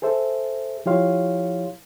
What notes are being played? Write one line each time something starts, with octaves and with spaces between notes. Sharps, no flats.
G#4 A4 C5 E5
F3 E4 G4 C#5 F5 C6